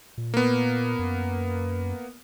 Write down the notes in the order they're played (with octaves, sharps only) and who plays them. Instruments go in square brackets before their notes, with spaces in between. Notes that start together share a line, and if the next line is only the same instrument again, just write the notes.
[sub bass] A#2
[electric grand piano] A#3 B3
[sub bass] F#2